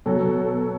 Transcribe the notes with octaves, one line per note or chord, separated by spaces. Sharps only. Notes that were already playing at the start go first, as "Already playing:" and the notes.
B2 F#3 A4